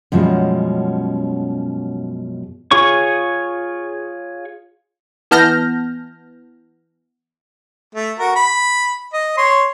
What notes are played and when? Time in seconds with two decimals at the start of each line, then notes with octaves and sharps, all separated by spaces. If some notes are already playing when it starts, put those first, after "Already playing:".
0.12 F#2 B2 F3 G3 G#3 C#4
2.71 F4 G#4 C#5 C#6
5.31 E3 B3 A5 F6 G6 A#6
7.95 A3
8.19 F#4 A#4
8.36 B5
9.13 D#5
9.37 C#5 C6